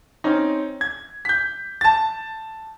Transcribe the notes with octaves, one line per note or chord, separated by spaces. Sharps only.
C4 C#4 D#4
G#6
G6 B6
A5 A6